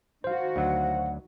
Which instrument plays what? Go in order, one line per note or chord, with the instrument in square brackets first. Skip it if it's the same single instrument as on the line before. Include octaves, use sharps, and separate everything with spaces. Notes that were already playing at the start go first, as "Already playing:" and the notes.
[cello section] D#3 F#4 [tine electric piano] C5 F5
[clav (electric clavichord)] D2 F#3 [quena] F#5